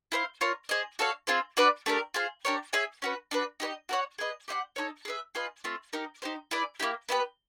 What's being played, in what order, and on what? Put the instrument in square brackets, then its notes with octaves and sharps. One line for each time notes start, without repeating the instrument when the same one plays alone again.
[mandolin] E4 A4 C5 F5
F4 A#4 C#5
G#4 C5 D#5
F#4 A4 C#5 F5
C4 F4 G#4 C5
D4 F#4 B4 D5
A3 D4 G4 A#4
F4 G#4 C5 F5
D4 G4 A#4 C#5
G#4 C#5 E5 G#5
C#4 F#4 B4
D4 F#4 B4
D#4 G4 B4 D#5
F#4 A#4 C#5 F#5
G#4 B4 D#5
G4 C5 D#5 F#5
D#4 F#4 A4 C#5
G#4 B4 E5
F4 G#4 B4 D#5
A3 C4 F4
D#4 G4 A#4
D#4 G4 C5
E4 G#4 B4 D5
A#3 C#4 E4 G4
B3 E4 G4 B4